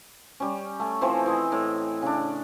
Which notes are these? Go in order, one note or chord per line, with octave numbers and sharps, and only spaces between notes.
G3 C#4
A3 G#5
E3 F3 C4 E4
E3 G#4 D#5
A2
C#3 D4